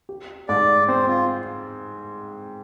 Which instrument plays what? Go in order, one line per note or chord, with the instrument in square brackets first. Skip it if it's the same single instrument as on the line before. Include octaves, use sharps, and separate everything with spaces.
[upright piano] G4
[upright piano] G#2 [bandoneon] D5
[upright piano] C4 [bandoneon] C5
[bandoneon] F4